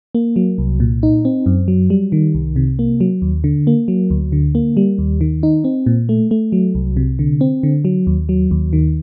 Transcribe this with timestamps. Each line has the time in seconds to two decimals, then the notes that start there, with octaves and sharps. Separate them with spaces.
0.15 A#3
0.36 F#3
0.58 C2
0.80 A#2
1.03 D#4
1.25 C4
1.46 F#2
1.68 F#3
1.90 G3
2.12 D#3
2.35 C2
2.56 C3
2.79 A#3
3.01 F#3
3.22 D#2
3.44 D3
3.67 A#3
3.88 F#3
4.10 D2
4.32 D3
4.55 A#3
4.77 G3
4.98 D#2
5.21 D#3
5.43 D#4
5.64 C4
5.86 A#2
6.09 A3
6.31 A3
6.52 F#3
6.75 C2
6.97 C3
7.19 D3
7.41 C4
7.63 D3
7.85 F#3
8.07 D#2
8.29 F#3
8.51 D#2
8.73 D#3